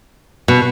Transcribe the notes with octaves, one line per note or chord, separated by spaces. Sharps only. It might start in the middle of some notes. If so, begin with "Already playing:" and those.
B2